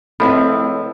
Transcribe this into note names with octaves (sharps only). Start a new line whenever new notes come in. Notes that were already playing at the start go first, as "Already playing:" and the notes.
C#2 F3 A3 C4 E4 A4 B5